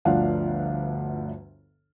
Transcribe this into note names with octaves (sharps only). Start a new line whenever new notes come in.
G1 D2 F3 D4 F5 F#5